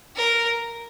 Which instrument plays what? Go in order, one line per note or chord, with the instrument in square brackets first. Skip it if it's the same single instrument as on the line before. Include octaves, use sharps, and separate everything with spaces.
[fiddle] A#4